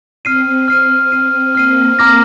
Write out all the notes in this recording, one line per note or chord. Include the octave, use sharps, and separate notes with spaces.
C4 F6 C7 D#7
C4 F6 C7 D#7
C4 F6 C7 D#7
A#3 F6 C7 D#7
A#5 D6 F6 A#6